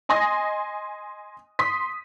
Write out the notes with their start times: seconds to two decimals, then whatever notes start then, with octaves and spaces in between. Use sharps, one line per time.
0.09 D#5 G#5 C6 D#6 A#6
1.59 C6 D#6 B6